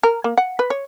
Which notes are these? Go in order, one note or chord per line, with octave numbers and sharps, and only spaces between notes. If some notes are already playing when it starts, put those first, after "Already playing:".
A#4
A#3
F#5
B4
C#5